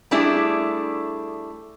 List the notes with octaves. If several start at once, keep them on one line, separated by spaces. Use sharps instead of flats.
G3 A3 D4 E4 G#4